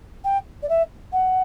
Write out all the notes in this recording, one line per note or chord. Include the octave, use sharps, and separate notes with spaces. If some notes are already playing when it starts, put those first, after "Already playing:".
G5
D5
E5
F#5